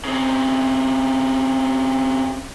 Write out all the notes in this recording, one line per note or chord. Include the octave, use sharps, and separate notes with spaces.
C#3 C4